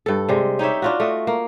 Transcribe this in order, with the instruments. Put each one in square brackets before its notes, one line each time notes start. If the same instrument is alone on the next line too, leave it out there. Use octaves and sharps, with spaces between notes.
[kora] G2 A4
C3 G3 G#3
D#4 G4 C#5 E5
D4 F4 F#4
A3 D#5
A#3